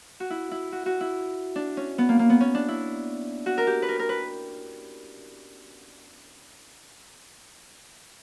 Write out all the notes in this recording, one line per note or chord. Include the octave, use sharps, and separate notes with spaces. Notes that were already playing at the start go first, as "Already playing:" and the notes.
F#4
E4
E4
F#4
F#4
E4
D4
C#4
B3
A#3
A#3
B3
C#4
D4
E4
F#4
A#4
G4
B4
A#4
A#4
B4